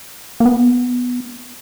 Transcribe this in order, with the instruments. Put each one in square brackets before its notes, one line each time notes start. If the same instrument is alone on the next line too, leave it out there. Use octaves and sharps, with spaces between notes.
[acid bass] A#3
B3